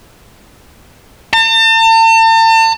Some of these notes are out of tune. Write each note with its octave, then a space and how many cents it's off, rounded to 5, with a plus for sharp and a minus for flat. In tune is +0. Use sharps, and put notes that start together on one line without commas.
A5 +40